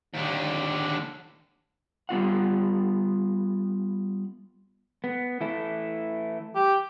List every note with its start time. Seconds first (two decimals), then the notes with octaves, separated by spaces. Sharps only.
0.14 D#2 D3
2.09 G3 B3 F4 F#5
5.04 B3
5.41 E3 A3 E4
6.55 G4